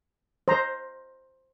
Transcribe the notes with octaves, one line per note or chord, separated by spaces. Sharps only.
C5 A#5